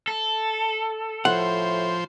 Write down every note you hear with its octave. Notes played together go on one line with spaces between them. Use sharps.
A4
A2 F3 C5 F#5